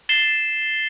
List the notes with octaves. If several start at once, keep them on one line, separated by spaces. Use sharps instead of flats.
A6 C7 E7 G7